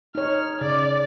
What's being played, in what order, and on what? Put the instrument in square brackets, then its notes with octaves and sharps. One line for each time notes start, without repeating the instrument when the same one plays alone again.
[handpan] D#4 C#5 [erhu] F6
[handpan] C#3 [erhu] D5